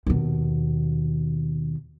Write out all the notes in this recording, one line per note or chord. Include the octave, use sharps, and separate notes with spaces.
D#2 B2